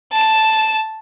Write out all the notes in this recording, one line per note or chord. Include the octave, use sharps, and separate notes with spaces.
A5 E7